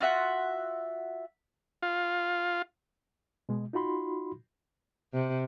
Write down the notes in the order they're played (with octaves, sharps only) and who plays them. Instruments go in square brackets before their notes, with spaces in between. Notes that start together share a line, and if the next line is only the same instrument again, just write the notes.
[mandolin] F4 F#4 E5 F#5
[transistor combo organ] F4
[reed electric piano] B2 G#3
D#4 F4 F#4 B5 C6
[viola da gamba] C3